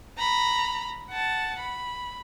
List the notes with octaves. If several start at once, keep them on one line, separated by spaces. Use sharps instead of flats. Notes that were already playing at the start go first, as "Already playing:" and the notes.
A#5 B5
F#5 A5
B5